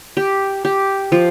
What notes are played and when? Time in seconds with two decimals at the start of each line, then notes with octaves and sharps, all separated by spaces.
0.17 G4
0.65 G4
1.12 F3